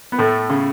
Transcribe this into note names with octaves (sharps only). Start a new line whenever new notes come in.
B3
A2 A3
C#3